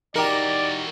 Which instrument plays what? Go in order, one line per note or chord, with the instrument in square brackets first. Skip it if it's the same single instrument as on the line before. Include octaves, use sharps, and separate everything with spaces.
[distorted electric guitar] E3 F#4 [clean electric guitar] D#4 G4 [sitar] A#4 [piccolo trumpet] D5